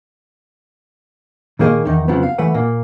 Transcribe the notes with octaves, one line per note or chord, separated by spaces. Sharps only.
A#2 D#3 A#3 G#4 A#4 D#5
E2 D#3 D#4
F2 C#3 F3 F#3 B3
F5
E3 A3 B4 F#5
A#2 A#3